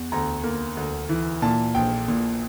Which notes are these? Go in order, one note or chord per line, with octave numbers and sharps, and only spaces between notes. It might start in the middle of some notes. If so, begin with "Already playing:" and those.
Already playing: E2
D2 A#5
A#3
D2
E3
A#2 A5
A#1 G5
A#2